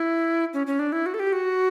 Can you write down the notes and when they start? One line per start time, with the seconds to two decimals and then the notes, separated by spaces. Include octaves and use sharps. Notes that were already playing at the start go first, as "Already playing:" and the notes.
Already playing: E4
0.54 C#4
0.67 C#4
0.79 D4
0.92 E4
1.06 F#4
1.14 A4
1.20 G4
1.33 F#4